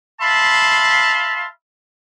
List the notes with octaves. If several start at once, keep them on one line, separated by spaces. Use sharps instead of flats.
E5 F5 A5 B5 C6